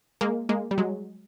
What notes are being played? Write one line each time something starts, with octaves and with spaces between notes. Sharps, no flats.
G#3 A#3
G#3 A#3
G3
F#3 G#3